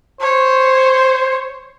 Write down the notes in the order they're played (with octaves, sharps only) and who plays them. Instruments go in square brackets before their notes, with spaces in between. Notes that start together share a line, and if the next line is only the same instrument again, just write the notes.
[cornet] C5 [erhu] C#5